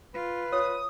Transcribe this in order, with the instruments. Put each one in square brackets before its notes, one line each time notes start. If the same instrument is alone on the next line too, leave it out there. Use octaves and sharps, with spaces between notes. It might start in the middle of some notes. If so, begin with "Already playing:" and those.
[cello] F4 [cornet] B4
[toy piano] C#5 [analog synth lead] D#6